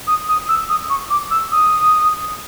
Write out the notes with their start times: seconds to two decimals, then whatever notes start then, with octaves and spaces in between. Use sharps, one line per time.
0.07 D#6
0.28 D#6
0.48 E6
0.69 D#6
0.90 C#6
1.10 D6
1.31 E6
1.51 D#6